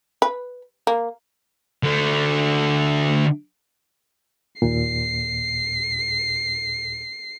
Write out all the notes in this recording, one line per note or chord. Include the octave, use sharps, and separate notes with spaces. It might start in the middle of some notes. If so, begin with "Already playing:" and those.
B4
A#3
D3 A3
D#2 A#2 C7